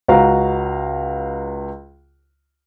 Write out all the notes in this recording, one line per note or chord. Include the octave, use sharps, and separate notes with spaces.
C#2 F#4 F5 A#5